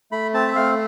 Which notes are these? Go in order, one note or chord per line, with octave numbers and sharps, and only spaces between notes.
A3 B5
C4 A5
E5
A3 F5